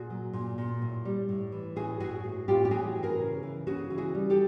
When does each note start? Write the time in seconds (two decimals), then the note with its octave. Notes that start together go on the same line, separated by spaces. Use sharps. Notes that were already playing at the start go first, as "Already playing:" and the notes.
Already playing: A#2 F#4 G#4
0.10 F#3
0.33 A#2
0.58 A#2
0.82 A2
1.05 G3
1.29 A2
1.52 E3
1.76 A2 F#4 G#4
2.00 A2 F#4 G#4
2.24 A2
2.48 A2 F4 G4
2.65 G4
2.71 E3 F#4 G#4
2.95 E3
3.03 G#4 A#4
3.19 C#3
3.43 E3
3.67 C#3 F#4 G#4
3.90 E3
3.98 F#4 G#4
4.15 G3
4.30 G4 A4